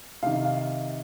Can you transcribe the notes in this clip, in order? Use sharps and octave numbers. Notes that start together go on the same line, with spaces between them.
C3 D#3 F5
F5